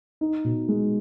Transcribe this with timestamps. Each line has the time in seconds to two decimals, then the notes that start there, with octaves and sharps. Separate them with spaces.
0.21 D#4
0.44 B2
0.68 G#3